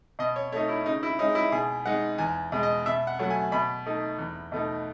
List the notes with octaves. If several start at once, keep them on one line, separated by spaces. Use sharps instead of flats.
B2 D#5
C#5
A3 D#4 C#5
E4
C#3 D#4
E4
G#3 C#4 D#4
E4
B2 G#4
G#3 D#4 F#5
E2 G#5
B2 G#3
D#5
B2 E5
F#5
F#3 A3 F#5
G#5
B2 B5
A3 D#4
E2
B2 A3 D#4